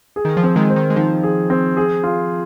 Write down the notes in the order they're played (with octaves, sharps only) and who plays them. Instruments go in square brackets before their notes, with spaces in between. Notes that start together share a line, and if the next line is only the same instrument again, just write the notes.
[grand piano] G#4
[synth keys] D#3
F3
[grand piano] C4
[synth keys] D#3 G#3
[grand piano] C5
[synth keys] D#3
G#3
[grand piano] D#3 [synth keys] F3
[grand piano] G#4
C4
G#4
F4